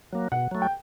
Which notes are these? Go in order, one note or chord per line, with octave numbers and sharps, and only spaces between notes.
F#3 A#3
B2 F#5
F#3 A3
G5